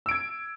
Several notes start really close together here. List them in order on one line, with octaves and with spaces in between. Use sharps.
E6 D7 G#6